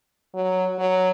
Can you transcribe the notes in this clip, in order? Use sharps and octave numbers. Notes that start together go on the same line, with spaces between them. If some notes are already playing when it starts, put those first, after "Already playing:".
F#3
F#3